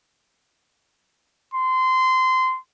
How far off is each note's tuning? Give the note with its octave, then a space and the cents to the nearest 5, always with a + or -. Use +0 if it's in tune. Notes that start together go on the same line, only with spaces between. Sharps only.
C6 -20